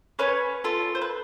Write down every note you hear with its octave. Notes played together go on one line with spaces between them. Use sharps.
C#4 B4 C#5
F4 A4
C5
B4